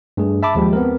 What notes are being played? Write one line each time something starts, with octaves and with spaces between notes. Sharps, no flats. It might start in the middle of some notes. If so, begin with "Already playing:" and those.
G2 A3 G#4
E5 A5 B5 D6
D#2 F3 G#3 G4
B3 C4 A#4